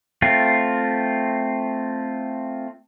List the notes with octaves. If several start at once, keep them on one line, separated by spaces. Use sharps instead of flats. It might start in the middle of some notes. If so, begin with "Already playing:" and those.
A3 C4 F4